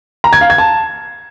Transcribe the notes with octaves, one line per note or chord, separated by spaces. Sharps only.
A#5
G#6
F5
G#6
A5